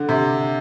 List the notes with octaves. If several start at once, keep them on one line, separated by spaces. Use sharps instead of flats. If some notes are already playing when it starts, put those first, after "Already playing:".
Already playing: D3
C3